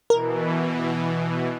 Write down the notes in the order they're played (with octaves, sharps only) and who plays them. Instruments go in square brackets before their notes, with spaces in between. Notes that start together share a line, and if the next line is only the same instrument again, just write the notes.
[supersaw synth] B2 E3 [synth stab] A#4